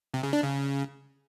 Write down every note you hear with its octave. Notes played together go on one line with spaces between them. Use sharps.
C3
C#3
D4
C#3